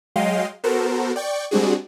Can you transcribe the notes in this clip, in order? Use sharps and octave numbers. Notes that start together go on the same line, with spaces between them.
F#3 G#3 D#5 F5 G5 C6
B3 F#4 A4 A#4 C5
D5 G5 C#6
G3 G#3 C4 D4 F#4 G#4